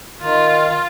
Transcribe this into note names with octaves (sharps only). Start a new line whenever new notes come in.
D#3 F4